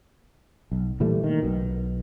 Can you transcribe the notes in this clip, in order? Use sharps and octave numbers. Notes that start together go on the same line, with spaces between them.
B1
A#2 E3 G3 A3
D#3
B1 B2